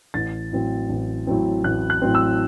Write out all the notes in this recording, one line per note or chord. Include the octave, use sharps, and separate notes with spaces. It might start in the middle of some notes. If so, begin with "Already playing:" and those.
A1 A6
A2 F#3 C4
A1
A2 F#3 C4
A1 F#6
F#6
A2 F#3 C4
E6